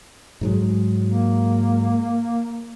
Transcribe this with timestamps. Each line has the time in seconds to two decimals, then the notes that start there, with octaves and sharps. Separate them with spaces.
0.41 G#2 F#3 G#3
1.07 A#3